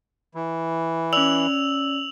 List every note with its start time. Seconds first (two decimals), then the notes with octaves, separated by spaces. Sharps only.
0.35 E3
1.13 C#4 D5 E6 F7 F#7